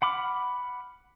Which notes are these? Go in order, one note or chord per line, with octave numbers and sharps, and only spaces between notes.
F#5 B5 D6 F6